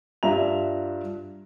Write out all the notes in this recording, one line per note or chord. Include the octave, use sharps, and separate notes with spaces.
G2 D4 F4 E5 A#5 F7